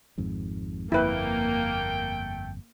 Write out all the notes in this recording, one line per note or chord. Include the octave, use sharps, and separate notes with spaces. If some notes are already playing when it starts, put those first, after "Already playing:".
G#1 F2 G#2
G1 F2 A3 A#3 E4 B4 G5